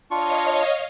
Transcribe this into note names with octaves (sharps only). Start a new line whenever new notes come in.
D4 F4 C#5 D#5 F5 C#6